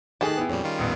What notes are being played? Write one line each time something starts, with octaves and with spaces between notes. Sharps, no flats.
D#3 A3 D#4 G4 G#4 A5 F#6
B3 E4
F2 A#2 G3 C#4
D#3 G3 F4
D#1 A1 B3